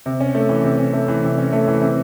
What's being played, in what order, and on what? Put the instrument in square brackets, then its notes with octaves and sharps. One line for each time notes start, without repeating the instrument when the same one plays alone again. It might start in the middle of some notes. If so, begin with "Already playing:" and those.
[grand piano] C3
C#4
A3
E3
C3
C#4
A3
E3
C3
C#4
A3
E3
C3